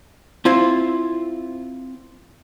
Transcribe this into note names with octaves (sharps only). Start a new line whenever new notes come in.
C4 E4 F4 C5